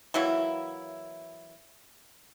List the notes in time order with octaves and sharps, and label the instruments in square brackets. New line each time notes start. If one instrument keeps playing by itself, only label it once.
[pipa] E3 F#3 A#3 E4